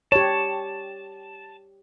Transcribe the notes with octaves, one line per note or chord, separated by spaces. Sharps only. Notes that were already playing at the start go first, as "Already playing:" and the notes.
G4 C#5 A5